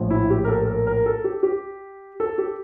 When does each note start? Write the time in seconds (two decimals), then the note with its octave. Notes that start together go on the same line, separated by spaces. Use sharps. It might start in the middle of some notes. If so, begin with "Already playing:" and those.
Already playing: A#1 A2 F3
0.10 E4
0.30 G4
0.44 A#4
0.48 A4
0.67 A#4
0.87 A#4
1.06 A4
1.24 G4
1.43 G4
2.20 A4
2.38 G4